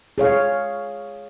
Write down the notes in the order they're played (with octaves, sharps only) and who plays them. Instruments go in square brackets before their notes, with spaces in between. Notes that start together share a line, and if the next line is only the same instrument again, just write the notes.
[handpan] G#4 C#5 F5